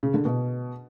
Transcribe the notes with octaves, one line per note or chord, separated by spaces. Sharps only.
C#3
D3
B2